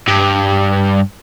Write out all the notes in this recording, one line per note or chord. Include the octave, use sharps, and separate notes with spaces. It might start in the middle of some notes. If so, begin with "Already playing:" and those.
G2